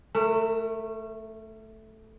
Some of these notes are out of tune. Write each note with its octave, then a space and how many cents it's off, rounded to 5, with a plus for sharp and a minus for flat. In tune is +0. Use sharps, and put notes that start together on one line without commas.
A3 +0 A#4 -40